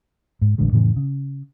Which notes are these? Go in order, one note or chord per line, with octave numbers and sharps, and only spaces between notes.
G#2
E1 A1 D3 G#3
F2 A2 C#3 E3
C#3